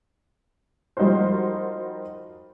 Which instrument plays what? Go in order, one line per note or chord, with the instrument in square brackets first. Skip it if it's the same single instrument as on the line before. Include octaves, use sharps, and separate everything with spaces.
[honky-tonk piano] F3 G3 D#4 F#4 A#4 C5